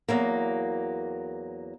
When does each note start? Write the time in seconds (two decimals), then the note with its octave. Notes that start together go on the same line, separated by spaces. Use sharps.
0.08 E2 F#3 A#3